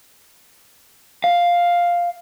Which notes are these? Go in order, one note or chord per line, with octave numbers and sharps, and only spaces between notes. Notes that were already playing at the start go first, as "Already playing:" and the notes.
F5